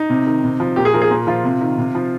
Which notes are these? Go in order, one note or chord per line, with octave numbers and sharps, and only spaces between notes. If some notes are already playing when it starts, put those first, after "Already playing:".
Already playing: D#4
C3
D#3
C3
F3
A#2 G4
G#4
F3 A#4
G#4
A#2
F3 F4
C3
D#3
C3
F3